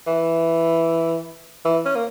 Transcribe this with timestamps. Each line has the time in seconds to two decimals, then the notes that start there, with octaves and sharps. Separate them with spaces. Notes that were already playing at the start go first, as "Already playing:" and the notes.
0.07 E3
1.65 E3
1.85 C#4
1.95 A#3